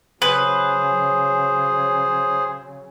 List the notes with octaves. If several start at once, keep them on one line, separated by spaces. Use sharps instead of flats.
C#3 F#3 G#4 B4 C5